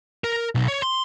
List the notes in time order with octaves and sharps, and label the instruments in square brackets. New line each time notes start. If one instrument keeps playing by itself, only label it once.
[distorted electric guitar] A#4
B1
C#5
C6